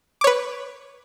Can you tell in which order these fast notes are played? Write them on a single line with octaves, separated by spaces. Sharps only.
D6 C#5 B4